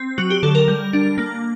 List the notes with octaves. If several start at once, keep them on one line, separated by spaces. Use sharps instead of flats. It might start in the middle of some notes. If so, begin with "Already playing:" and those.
Already playing: C4
F#3 F#4
G4
D3 A4
A#4
G3
D4
A#3